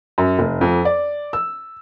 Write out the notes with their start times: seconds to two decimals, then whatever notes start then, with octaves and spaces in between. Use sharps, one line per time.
0.18 F#2
0.39 F1
0.61 F2
0.85 D5
1.33 E6